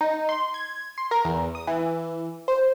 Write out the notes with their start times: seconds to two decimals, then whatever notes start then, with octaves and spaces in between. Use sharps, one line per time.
0.01 D#4
0.29 C6
0.54 G#6
0.98 C6
1.11 A#4
1.25 E2
1.55 D#6
1.67 E3
2.48 C5